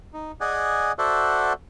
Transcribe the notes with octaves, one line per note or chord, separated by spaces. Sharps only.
D#4
G#4 D5 D#5 F#5 G#5
F#4 A4 C5 D5 E5 F#5